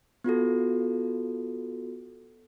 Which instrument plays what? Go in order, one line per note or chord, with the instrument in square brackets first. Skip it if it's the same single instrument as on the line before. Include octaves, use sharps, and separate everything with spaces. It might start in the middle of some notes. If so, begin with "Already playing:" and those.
[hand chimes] B3 F4 F#4 A4